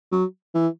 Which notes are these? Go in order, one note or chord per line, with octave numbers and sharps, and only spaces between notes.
F#3
E3